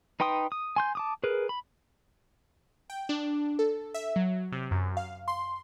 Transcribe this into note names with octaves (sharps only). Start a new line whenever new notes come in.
D#4 B4 G5 C6 D#6
D#6
G#5 C6 G6
A5 D6 D#6
G#4 A#4 B4
B5
G5
D4
A4
E5
F#3
C3
F#2
F5
C6